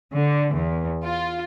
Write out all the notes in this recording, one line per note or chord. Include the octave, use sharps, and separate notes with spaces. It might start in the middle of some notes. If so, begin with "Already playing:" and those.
D3
E2
F4